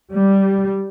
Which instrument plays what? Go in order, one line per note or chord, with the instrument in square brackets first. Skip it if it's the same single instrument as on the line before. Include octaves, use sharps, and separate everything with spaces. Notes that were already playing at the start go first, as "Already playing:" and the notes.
[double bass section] G3